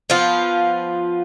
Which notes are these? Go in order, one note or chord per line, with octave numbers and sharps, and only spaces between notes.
F3 B3 F4